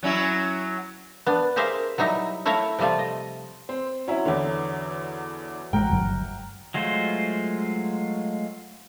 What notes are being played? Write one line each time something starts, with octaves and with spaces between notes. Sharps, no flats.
F#3 C#4 E4
B3 D4
G4 G#4 A#4 C5 E5 F5
F#3 G3 D#4 E4
A3 E4 C#5 E5 F5 A#5
C3 F3 G3 A3 F4
D#5
C4 C6
F#3 C#4 E4
E2 D3 B4 E5 F#5
A1 G#3 A#4 F#5 G5
G1 G2 F#3
F#3 G#3 A3 F4 C5